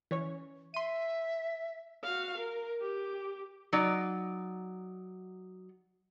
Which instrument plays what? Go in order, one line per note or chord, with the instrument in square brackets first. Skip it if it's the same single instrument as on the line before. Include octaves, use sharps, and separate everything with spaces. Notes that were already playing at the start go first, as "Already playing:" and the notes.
[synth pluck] E3 C#4 C#5
[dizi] E5 [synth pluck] C6 D#7
[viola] F#4 F5
A#4
G4
[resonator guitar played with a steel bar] F#3 D#4 D5